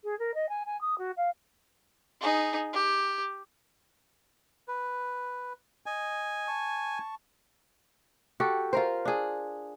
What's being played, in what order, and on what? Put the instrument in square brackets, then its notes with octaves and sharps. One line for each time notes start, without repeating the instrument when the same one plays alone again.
[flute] G#4
A#4
D#5
G#5
G#5
D#6
F#4
F5
[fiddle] D#4 G#4
G4
[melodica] B4
[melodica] D#5 [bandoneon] G#5
[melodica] A5 C#6
[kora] F#4 G4 A4
F4 A#4 C5
D4 G#4